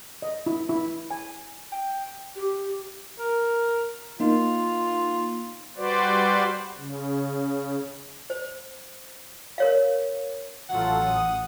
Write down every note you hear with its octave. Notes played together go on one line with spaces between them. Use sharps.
D#5
E4
E4
G#5
G5
G4
A#4
A#3 D#4 F4
G3 F#4 B4 C5 D5
C#3
C5
A#4 C#5 F5
A1 F#3 F4 A4 F#5
D#6